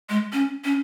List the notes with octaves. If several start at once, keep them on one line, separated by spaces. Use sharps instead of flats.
G#3
C#4
C#4